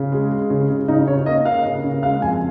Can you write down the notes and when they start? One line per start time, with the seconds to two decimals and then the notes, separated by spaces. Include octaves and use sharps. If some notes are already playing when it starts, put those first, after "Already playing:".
Already playing: C#3
0.12 G#3
0.31 G#3
0.50 C#3
0.70 C#3
0.88 C#3 D#4
1.08 C#3 C#5
1.26 A#3 D#5
1.45 A#3 F5
1.65 C#3
1.84 C#3
2.03 G#3 F5
2.22 F2 G#5